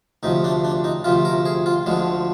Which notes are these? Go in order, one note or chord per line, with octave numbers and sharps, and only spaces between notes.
D2 C3 F3 D#4
D4
D4
D#4
D2 C3 F3 F4
A#4
G#4
F4
D2 D3 F3 G#3